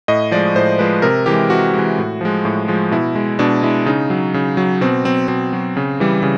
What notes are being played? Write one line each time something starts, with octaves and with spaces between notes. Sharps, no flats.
A2 D#5
F3 G#3 D5
A2 C5
F3 G#3 B4
C3 A#4
E3 G#3 G4
C3 F#4
E3 G#3
A2
F3 G#3
A2
F3 G#3
B2 E4
G#3
B2 D4
G#3 E4
C#3 D#4
F#3
C#3
F#3
B2 C4
F#3 C4
B2 C4
F#3
C#3
E3 G3
C#3